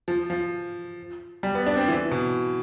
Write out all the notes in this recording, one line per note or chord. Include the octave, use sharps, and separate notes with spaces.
F3
F3
G3
B3
D4
C4
E3
B2